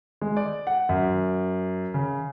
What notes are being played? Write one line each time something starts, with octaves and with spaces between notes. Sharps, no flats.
G#3
D5
F#5
F#2
C#3